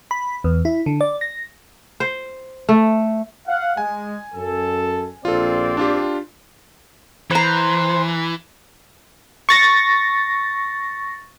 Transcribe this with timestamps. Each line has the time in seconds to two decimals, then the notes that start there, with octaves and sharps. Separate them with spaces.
0.11 B5
0.44 E2
0.65 E4
0.86 D3
1.01 D5
1.21 A#6
2.00 C5
2.69 A3
3.47 F5 F#5
3.77 G#3 G#5
4.35 F#2 A4
5.25 A#1 C4 F4 A4 D5
5.77 D4 F4 G4
7.31 E3 B4 C5 A#5
9.49 C#6 A6 A#6